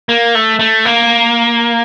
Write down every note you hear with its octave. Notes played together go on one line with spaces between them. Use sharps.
A#3
A3
A3
A#3